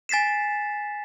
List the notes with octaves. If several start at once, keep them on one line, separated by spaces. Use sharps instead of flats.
G#5 A6 B6 C7 E7